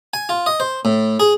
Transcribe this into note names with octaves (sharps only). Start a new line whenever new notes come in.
G#5
F4
D#5
C5
A2
G#4